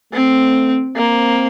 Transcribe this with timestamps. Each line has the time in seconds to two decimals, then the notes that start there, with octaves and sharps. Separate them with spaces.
0.13 A3 C4
0.96 A#3 C4